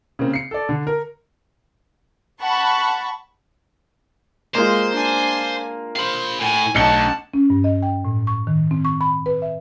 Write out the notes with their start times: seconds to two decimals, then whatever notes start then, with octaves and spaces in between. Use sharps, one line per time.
0.19 C#3 A#3 C4
0.34 C7 C#7
0.51 A4 D5
0.69 D3
0.87 A#4
2.40 F#5 A5 B5 C#6
4.55 G#3 A#3 F4 C5
4.94 D4 G#5
5.96 C5 F5 B5
6.40 A2 G#5
6.75 B1 A3 D4 F#5 A5 C#7 G7
7.34 C#4
7.50 G2
7.64 D#5
7.83 G5
8.05 A2
8.27 C#6
8.47 D#3
8.71 C4
8.85 C#6
9.01 B5
9.26 B4
9.42 E5